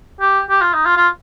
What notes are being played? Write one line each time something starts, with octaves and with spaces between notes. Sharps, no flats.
G4
G4
F4
D#4
F4
F4